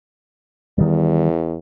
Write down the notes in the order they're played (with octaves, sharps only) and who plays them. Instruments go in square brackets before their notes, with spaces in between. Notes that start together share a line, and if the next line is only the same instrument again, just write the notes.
[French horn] E2 [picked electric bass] D#3 G3